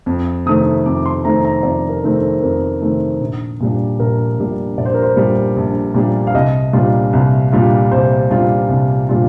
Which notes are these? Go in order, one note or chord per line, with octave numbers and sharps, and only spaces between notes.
F2
C3 D#3 A3 C4 D#6
F2 D6
C6
C3 D#3 A3 C4 A#5
A#5
F2 D5
A#4
C3 D#3 A3 C4
A4
F2 A#4
C3 D#3 A3 C4
A#1
A#2 G3 D4
A#1 A#4
A#2 G3 D4
A#1 D5
C5
A#4
C5
A#2 G3 D4
A#1
A#2 G3 D4
F5
C2 D#5
A#2 G3 D4 F4
C2
A#2 G3 D4 F4
C2 C5
A#2 G3 D4 F4
C2
A#2 G3 D4 F4